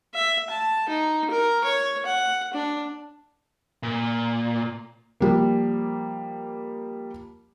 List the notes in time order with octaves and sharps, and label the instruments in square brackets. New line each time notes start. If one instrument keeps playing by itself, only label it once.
[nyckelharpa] E5
A5
D#4
A#4
C#5
F#5
D4
[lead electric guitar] A#2
[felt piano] F3 G3 A#3